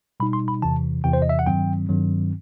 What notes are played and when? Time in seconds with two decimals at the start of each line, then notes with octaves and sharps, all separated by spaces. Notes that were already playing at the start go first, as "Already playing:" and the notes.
0.20 B2 G3 D#4 B5
0.33 C6
0.48 B5
0.62 E2 C3 E3 A5
1.04 E2 C3 E3 G5
1.13 C5
1.22 D#5
1.29 E5
1.39 F#5
1.46 G2 D#3 F#3 C4 G5
1.89 G2 D#3 F#3 C4